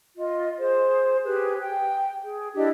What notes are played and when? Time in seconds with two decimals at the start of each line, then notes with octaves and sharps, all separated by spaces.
0.18 F4 D#5
0.59 G#4 C5
1.24 G4 G#4 B4
1.59 G5
2.24 G#4
2.54 D4 E4 G4 D#5